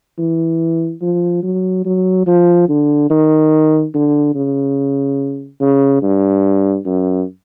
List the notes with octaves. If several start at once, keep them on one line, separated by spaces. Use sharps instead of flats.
E3
F3
F#3
F#3
F3
D3
D#3
D3
C#3
C#3
G2
F#2